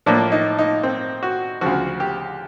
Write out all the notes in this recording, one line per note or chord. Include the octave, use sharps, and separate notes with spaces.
A2 F3 A#3 D4
D#4
D#4
C4
F#4
D2 C#3 F3 F#4
G4